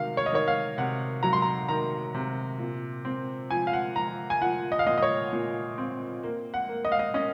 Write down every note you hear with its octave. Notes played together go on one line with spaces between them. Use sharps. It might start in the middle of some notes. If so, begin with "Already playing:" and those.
Already playing: C3 D#3 F#3 F5
C#5
D#5
D#3 C#5
F5
C3 F#5
F#3 A#5
C6
A#5
D#3 A#5
C3
A#2
C4
F3 G#5
F5
F#5
F3 A#5
G#5
F3 F#5
D#5
F5
A#2 D#5
D#5
C#5
A#2
C4
A#3
F#5
A#3
D#5
F5
D#5
C#4 D#5